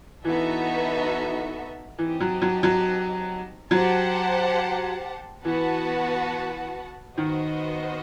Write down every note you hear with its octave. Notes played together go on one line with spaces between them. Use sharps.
E3 B3 D#4 F#4 A4 E5
E3 C4 D#4 G4 D#5 A5
F#3
F#3
F#3
F#3 G4 C5 F#5 A5
E3 B3 F#4 B4 F#5 A5
D#3 B3 F#4 C5 D#5